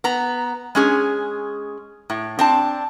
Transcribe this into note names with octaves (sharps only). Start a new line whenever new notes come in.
B3 A#5
G#3 C#4 G#4
A2
C4 D4 A5